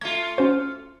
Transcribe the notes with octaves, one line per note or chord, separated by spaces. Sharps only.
A3 F4 G#6
C#4 F#4 C5